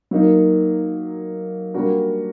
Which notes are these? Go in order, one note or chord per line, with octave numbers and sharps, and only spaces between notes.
F#3 A#3 D#4
G3 A#3 D4 F#4 A#4